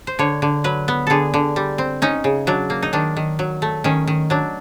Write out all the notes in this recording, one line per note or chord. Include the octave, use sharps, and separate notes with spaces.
C5
D3 C#5
D3
F#3 B4
B3
D3 G#4 A4
D3
G3
C4
C#4 D#4
C#3
F#3 D4
A#3
D#4
D#3 D4
D#3
F#3
A3
D#3 C#4
D#3
F#3 D4